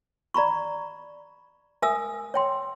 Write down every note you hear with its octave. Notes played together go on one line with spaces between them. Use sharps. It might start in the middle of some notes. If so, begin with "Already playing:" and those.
D5 A#5 B5 C#6
A#4 E5 G#5 D#6 E6
C#5 G5 C6